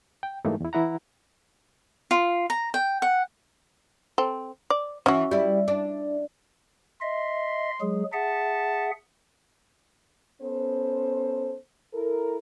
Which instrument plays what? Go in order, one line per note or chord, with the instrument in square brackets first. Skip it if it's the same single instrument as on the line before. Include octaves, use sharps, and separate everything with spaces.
[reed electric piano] G5
G#2 E3 G3 A3 A#3 D#4
E2 E4
E3 E4 F#5 A#5
[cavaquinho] F4
A#5
G5
F#5
[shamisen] C4 A4
D5
[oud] E3 [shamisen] C#4 F#4
[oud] G3 E4
D4
[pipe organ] D#5 E5 [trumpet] C6
[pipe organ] F#3 G#3 G#4
[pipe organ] G#4 E5 F#5 [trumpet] A5
[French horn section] B3 C#4 A4 C5
E4 A4 A#4